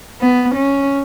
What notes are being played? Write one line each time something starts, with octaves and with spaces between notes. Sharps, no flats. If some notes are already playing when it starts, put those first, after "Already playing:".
B3
C#4